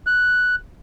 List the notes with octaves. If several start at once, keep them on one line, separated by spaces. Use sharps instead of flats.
F#6